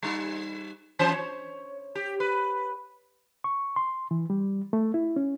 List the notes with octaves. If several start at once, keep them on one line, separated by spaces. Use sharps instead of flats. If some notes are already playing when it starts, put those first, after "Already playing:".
G3 D#4
E3 C#4 C5
C#5
G4
B4
C#6
C6
E3
G3
A3
E4
C#4